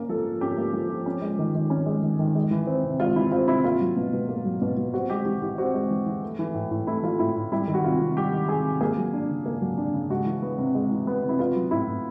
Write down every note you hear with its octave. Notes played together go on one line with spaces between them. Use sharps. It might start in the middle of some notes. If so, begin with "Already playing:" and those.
Already playing: A#3 C#4 A#4
F3 A4
F3
C#4 G4
A#3
F3
F3
C#4
G#3
D#3
D#3
C#4
G#3
D#3
D#3
G#3
E3
C4
C3
G#3 F4
E3 E4
C4 F4
C3 E4
A#3 F4
F#3
B2
B2
A#3
F#3
B2
B2
C4 F#4
G#3 G4
E3 G4
E3 G4
C4 F#4
G#3
E3
E3
A3
E3
A2
A2
A3 E4
E3 F4
A2 E4
A2
G3 E4
D#3
F#4
C3 F4
C3
G3 G4
D#3
C3 G#4
C3
A#3 G#4
F#3
D4
C#3
A#3
F#3
D4
C#3
G#3 F#4
E3
B3
C3
G#3
E3
B3
C3
E4
B3 F4
F#3
A2 E4
A2